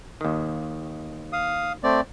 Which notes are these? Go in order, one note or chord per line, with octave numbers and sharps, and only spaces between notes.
D#2 D#3
F5 D#6
A3 C4 D5